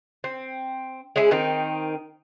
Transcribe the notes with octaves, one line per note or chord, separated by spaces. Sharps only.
C4
G#3 C#4 E4 G#4
D#3 C4 D#4